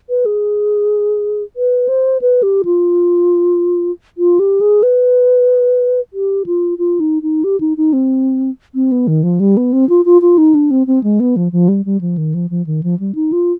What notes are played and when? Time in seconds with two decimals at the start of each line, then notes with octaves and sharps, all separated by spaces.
0.09 B4
0.26 G#4
1.56 B4
1.88 C5
2.21 B4
2.43 G4
2.65 F4
4.18 F4
4.39 G4
4.61 G#4
4.83 B4
6.13 G4
6.46 F4
6.78 F4
7.00 D#4
7.22 D#4
7.44 G4
7.60 D#4
7.77 D#4
7.93 C4
8.75 C4
8.92 B3
9.08 D#3
9.23 F3
9.40 G3
9.57 B3
9.73 C4
9.89 F4
10.05 F4
10.22 F4
10.38 D#4
10.54 D4
10.71 C4
10.87 C4
11.03 G#3
11.20 B3
11.36 F3
11.52 F3
11.68 G3
11.85 G3
12.01 F3
12.18 D#3
12.34 F3
12.50 F3
12.66 D#3
12.83 F3
12.99 G3
13.15 D#4
13.32 F4